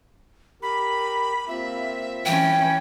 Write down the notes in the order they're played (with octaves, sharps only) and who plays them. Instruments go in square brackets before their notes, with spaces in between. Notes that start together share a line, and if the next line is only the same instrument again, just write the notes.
[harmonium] G4 A#4 [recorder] B5
[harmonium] A#3 C4 F4 [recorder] E5
[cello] E3 C#4 [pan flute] G5